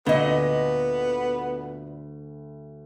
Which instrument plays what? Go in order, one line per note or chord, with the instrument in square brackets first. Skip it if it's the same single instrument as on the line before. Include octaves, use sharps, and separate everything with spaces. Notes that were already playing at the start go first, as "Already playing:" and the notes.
[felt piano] D2 [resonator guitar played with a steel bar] A#2 D#5 [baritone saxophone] B3